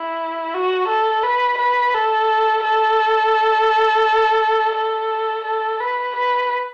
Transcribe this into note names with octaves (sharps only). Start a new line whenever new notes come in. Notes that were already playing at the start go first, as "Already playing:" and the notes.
Already playing: E4
F#4
A4
B4
B4
A4
A4
A4
A4
B4
B4